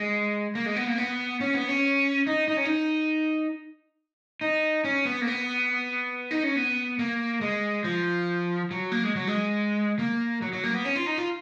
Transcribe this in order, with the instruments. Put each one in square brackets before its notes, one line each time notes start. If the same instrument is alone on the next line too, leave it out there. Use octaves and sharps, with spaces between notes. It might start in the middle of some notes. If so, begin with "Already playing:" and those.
Already playing: [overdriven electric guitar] G#3
A#3
G#3
B3
A#3
B3
C#4
B3
C#4
D#4
D#4
C#4
D#4
D#4
C#4
B3
A#3
B3
D#4
C#4
B3
A#3
G#3
F3
F#3
A#3
G#3
F#3
G#3
A#3
F#3
F#3
A#3
B3
C#4
F4
D#4
F4